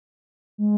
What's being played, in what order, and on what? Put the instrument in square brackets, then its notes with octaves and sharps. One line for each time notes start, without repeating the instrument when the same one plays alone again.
[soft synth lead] G#3